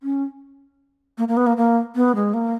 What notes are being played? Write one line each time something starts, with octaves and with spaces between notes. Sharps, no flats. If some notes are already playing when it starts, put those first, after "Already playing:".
C#4
A#3
A#3
B3
A#3
A#3
B3
G#3
A#3